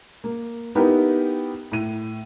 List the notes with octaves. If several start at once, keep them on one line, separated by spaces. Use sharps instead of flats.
A#3
B3 D#4 E4 G4 A#4 B4
A2 D#7